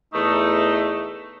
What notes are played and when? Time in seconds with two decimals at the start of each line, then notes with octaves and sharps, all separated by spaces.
0.13 E2 A3 D#4